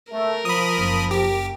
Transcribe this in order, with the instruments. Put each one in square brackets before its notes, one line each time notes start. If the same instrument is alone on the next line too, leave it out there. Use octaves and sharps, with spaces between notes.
[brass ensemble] A3 [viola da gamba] A#4
[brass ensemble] F3 [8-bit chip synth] B5 D#6
[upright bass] F#1
[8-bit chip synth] G4